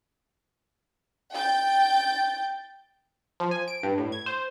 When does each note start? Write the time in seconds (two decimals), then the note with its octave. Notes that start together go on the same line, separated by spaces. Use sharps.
1.32 G5 G6 A6
3.40 F3
3.51 G#5
3.68 D7
3.83 G2
3.98 A2
4.12 G#6
4.26 C5